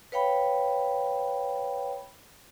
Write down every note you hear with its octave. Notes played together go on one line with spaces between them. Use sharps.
B4 C#5 F5 G5 B5